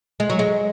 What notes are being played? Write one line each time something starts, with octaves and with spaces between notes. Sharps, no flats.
G#3
F#3
G#3